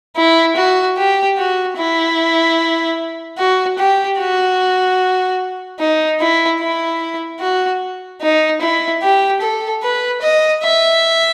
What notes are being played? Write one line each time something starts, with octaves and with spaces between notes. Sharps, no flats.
E4
F#4
G4
F#4
E4
F#4
G4
F#4
D#4
E4
E4
F#4
D#4
E4
G4
A4
B4
D#5
E5